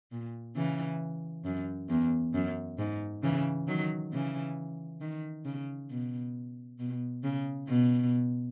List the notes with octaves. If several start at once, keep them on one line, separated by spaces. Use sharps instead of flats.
A#2
C#3 E3
F#2
E2
F#2
G#2
C#3 E3
D#3 F#3
C#3 E3
D#3
C#3
B2
B2
C#3
B2